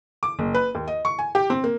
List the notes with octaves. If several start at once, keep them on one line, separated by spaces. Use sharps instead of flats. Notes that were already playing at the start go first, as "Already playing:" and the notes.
D6
F#1
B4
D#2
D#5
C#6
G#5
G4
C4
A#3